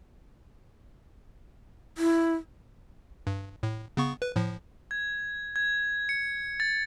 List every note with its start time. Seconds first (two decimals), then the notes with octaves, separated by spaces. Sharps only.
1.98 E4
3.27 G2
3.63 A2
3.97 C#3 B3 C#6
4.22 B4
4.36 A2 F3
4.91 G#6
5.56 G#6
6.09 C#7
6.60 A6